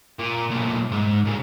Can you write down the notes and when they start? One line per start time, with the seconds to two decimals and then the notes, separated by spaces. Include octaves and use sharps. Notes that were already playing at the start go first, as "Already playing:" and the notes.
0.19 A#2
0.50 B1 A#2
0.92 G#2
1.25 A#2 C#3